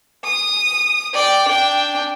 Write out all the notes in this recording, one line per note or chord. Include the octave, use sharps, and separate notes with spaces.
D#6
D5 G5
D4 G5